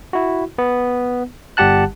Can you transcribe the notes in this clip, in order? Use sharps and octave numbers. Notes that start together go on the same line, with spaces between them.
E4 F#4
B3
G1 G3 G4 F#5 A5 F#6